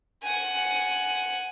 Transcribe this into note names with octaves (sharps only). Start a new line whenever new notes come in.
F#5 G#5